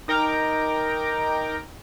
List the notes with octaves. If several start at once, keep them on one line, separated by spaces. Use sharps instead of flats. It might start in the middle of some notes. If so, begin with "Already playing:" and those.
D#4 A#4 G5 A#5 D6